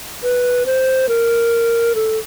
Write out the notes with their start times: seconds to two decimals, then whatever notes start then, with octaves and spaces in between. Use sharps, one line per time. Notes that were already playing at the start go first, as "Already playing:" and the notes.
0.23 B4
0.66 C5
1.09 A#4
1.95 A4